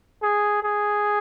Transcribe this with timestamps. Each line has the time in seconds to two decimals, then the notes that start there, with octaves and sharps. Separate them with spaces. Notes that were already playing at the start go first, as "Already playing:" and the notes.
0.22 G#4
0.62 G#4